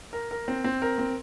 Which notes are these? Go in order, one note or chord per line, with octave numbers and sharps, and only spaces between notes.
A#4
A#4
C4
C4
A#4
C4